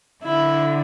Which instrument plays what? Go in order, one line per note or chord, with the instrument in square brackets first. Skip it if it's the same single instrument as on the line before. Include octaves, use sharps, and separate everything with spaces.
[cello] D3 [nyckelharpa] E4